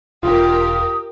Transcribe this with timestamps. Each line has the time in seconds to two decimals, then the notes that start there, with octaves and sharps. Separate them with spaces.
0.23 E1 F4 G4 A#4 D#6